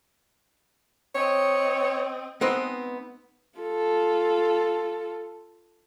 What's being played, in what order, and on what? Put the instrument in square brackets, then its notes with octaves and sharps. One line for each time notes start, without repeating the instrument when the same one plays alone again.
[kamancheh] C4 D#5 [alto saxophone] C#5
[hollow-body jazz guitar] G#3 B3 C4 D#4 B4 D#5
[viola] F4 A4